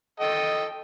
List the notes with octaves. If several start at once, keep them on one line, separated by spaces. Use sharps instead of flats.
A4 D#5 G5